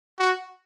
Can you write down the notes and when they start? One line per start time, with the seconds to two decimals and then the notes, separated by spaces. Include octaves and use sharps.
0.19 F#4